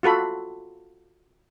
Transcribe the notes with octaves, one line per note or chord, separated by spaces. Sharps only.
F4 F#4 A4 B5